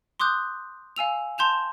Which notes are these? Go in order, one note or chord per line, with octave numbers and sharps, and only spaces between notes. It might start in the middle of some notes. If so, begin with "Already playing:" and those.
C6 D6 D#6 F#6 G6
F5 G#5 E6 F7
A5 C6 G6 E7 F7